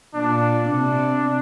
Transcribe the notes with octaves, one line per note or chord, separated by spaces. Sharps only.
A#2 D4
C3 D4